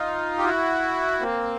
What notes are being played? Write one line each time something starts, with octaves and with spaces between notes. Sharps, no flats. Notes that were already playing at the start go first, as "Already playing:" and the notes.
Already playing: D#4 F4
G4
E4 F#4
A#3 C4